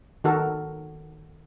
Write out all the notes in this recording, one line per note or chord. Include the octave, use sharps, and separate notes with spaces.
D#3 F#4 A4 A#4